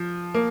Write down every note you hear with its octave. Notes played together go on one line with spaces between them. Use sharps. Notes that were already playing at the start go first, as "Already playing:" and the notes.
Already playing: F3
A#3